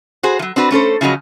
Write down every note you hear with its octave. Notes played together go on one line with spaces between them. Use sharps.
F#4 G#4 C5
F3 F#3
C4 D4 F#4 B4
A3 C#4 A4 C5
C#3 F3 F#3 F#4 D#5